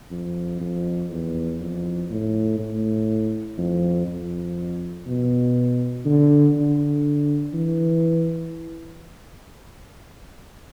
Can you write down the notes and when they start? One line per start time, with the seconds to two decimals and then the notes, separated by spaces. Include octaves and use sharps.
0.11 F2
0.60 F2
1.10 E2
1.60 F2
2.10 A2
2.59 A2
3.58 F2
4.07 F2
5.07 B2
6.05 D3
6.55 D3
7.54 E3